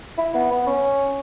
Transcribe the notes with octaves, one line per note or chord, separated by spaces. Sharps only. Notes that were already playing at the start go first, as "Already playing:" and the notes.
E4
B3
B3
C#4